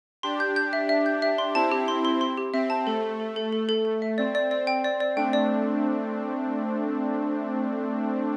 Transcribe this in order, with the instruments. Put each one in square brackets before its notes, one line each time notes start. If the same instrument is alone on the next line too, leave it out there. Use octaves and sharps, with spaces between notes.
[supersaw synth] D4 G4 [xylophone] C6
[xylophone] G6
G6
E5
E5
G6
E5
C6
[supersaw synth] C4 E4 [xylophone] A5
[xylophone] G4
C6
C6
C6
G4
[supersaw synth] C4 [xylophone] E5
[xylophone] A5
[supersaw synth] A3 [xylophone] A4
[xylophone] A4
A4
A4
[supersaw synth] A3 [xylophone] A4
[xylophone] A4
A4
E5
[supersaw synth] C4 [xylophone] D5
[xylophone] D5
[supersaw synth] C4 [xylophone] D5
[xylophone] G5
D5
D5
[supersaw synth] A3 D4 [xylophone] G5
[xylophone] D5